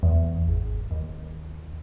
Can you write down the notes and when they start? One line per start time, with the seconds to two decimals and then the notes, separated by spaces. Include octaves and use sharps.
0.03 E2
0.48 G#1
0.91 D#2